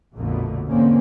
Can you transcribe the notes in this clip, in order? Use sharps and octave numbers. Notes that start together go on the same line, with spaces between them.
A#1 F2 B2 D3 A3 A#3
E2 G#2 D3 A#3 C4 C#4